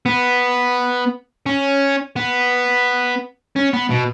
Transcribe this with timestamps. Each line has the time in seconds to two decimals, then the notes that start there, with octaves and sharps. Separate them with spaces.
0.06 B3
1.46 C#4
2.16 B3
3.56 C#4
3.73 B3
3.91 B2